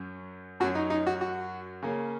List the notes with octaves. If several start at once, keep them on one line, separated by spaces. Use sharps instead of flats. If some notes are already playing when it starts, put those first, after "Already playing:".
Already playing: F#2 F#3 C#4
F#2 F#3 C#4 F#4
D#4
D#4
F#4
F#4
C#3 A#3 C#4